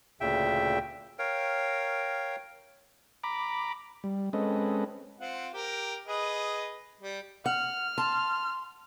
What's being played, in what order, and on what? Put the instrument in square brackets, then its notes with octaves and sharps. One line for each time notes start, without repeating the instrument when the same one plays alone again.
[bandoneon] D2 A#2 C#3 E5 G5
[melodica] A#4 C#5 F5 G5
[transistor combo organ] A#5 B5 D6
G3
G#3 C4 C#4 A4 B4 D#5
[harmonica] C4 F4 F#5
G4 A#4
G#4 B4 D#5
G3
[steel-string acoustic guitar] F#5 [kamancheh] F6
[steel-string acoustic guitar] A5 [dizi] C6